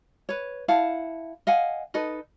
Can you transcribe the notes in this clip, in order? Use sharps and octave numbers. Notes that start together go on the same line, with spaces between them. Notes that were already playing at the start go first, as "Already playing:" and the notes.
B4 C#5
E4 F5 F#5 A5
D#5 F5 F#5 G#5
D#4 A4 B4 D#5